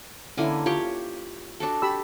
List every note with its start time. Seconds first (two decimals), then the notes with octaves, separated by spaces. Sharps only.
0.37 D3 A#3 C#4 E4 G#5
0.66 F4 G4 C#5
1.60 D4 F#4 A4
1.82 G4 B5 E6